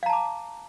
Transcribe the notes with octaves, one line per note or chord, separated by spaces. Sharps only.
F5 A5 A#5 D6